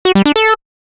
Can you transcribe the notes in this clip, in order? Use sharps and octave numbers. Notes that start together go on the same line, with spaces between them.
F#4
G3
D4
A4